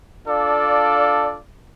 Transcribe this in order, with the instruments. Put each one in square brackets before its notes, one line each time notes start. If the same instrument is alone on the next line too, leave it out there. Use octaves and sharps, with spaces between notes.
[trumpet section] D4 F4 A4 D5 F5